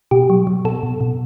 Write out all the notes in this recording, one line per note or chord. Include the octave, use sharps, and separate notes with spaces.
B2 G4
F#3
F#3
B2 A4
B2
B2